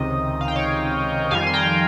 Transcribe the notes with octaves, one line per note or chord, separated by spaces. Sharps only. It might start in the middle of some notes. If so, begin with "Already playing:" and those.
Already playing: C#2 C3 D#3 D#5
F5
G5
C#5 F5
F2 D#3 G3 F5 G#5
C6
G5 A#5